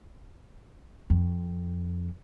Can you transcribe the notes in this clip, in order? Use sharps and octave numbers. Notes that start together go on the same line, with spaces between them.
F2